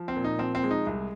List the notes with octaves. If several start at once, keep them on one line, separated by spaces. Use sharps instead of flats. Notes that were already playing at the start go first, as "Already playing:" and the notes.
Already playing: F3
C4
A#2
D#4
F3 C4
C4
G#3
D#4
C2